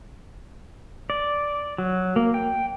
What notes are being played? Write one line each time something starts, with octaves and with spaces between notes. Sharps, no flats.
D5
F#3
A#3
G5